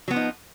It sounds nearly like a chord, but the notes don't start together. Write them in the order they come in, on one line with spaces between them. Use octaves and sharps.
F#3 B3 F3 D#4